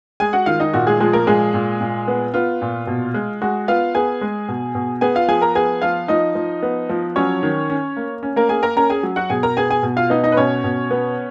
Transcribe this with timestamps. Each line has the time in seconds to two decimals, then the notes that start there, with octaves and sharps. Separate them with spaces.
0.20 G#3 G#4 G#5
0.33 F#4 F#5
0.46 D#3 F4 F5
0.60 D#4 D#5
0.74 A#2 F#4
0.87 G#3 G#4
1.00 F3 G#3 G#4
1.13 A#3 A#4
1.27 A#2 G#3 G#4
1.54 A#2
1.81 A#2
2.08 B3
2.34 B3 F4
2.62 A#2
2.87 B2
3.14 G#3
3.42 G#3 F#4
3.68 B3 F4 F5
3.95 B3 G#4 G#5
4.21 G#3
4.49 B2
4.75 B2
5.01 B3 G#4 G#5
5.15 F4 F5
5.28 F3 G#4 G#5
5.41 A#4 A#5
5.55 B3 G#4 G#5
5.82 F3 F4 F5
6.08 F3 D#4 D#5
6.35 F3
6.63 B3
6.89 F3
7.16 F#3 C#4 C#5
7.43 D#3
7.70 C#4
7.96 A#3
8.23 C#4
8.36 A#3 A#4
8.49 A#3 G#4 G#5
8.63 A#4 A#5
8.77 C#4 A#4 A#5
8.90 G#4 G#5
9.03 F#3
9.16 F#4 F#5
9.30 B2 G#4 G#5
9.43 A#4 A#5
9.57 B3 G#4 G#5
9.70 G#4 G#5
9.83 B2
9.97 F4 F5
10.10 B3 D#4 D#5
10.23 D#4 D#5
10.32 B4
10.37 B2 C#4 C#5
10.64 B2
10.91 B3